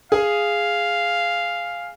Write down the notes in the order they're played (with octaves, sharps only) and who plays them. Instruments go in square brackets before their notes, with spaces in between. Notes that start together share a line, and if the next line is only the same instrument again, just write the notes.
[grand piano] G#4 G#5 [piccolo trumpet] F5